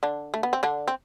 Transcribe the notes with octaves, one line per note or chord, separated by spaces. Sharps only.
D3 D4
A3
B3
C4
D3 D4
C4